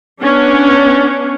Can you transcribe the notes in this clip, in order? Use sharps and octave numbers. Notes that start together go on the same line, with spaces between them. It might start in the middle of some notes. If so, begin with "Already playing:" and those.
B3 C#4 D4